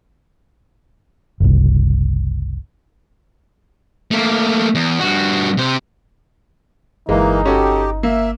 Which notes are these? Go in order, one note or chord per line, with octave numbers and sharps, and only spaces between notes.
F#1 C2
A3 A#3
E2
G2 F#4
C3 C5
G1 E3 G#3 A#3 D#4
C#4 F#4 G4 A4
A#3 E5